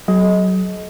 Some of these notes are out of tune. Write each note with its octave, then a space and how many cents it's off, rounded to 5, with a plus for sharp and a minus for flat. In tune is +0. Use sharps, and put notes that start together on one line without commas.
F#3 +20 A4 -45 D#5 +20